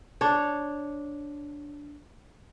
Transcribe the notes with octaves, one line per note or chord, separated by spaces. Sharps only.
D4 C#5